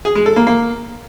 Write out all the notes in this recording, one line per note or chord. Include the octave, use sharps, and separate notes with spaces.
G#4
G#3
A4
A#3
A#3